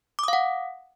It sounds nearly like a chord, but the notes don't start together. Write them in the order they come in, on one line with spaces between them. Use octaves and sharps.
D6 D#6 F5 F#5